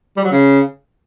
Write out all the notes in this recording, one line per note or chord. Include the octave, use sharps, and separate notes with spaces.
G3
F#3
C#3